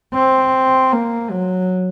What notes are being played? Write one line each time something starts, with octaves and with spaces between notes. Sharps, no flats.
C4
A#3
F#3